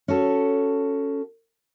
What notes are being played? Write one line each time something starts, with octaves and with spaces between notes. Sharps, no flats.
C#4 F#4 A4